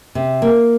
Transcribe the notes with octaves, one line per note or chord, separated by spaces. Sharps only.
C3
A#3